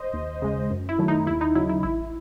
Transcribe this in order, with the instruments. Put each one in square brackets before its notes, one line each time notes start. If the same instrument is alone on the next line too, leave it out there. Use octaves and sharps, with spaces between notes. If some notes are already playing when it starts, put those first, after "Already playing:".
Already playing: [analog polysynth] C5 D#5
D#2
C#3 G#3
F#2
E4
D#3 F#3 A3
D#4
D#2 E4
D#4
C#3 F#3 E4
E4
A1 E4